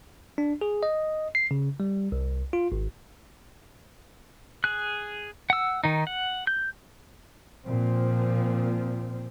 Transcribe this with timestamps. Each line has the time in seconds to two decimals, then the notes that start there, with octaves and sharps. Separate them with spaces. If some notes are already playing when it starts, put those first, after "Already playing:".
0.38 D4
0.61 G#4
0.83 D#5
1.35 C7
1.51 C#3
1.80 G3
2.12 C2
2.53 F4
2.72 G#1
4.64 G#4 F#6
5.50 F#5 E6
5.84 D#3 D#4
6.07 F#5
6.47 G6
7.67 A#2 F3 C4